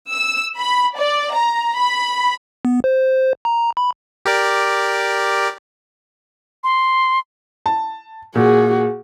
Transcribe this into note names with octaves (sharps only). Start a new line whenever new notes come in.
E6
B5
D5
A#5
B5
B3
C5
A#5
B5
G4 A#4 D5
C6
A5
A#2 F#4 G#4